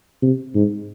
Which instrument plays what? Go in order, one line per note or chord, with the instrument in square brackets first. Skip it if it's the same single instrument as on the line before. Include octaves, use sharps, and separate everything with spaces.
[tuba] C3
G#2